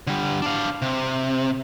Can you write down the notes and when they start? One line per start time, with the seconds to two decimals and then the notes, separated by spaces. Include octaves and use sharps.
0.07 D3 G3
0.42 D4 F5
0.82 C3